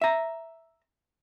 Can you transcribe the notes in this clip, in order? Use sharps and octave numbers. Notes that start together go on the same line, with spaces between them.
E5 A#5